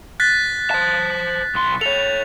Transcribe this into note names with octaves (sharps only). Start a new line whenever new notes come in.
F#6 A6 B6
C5 A5
B1 C6
A4 C#5 F7